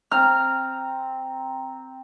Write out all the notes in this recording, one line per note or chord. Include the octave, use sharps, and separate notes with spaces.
C4 A#5 F6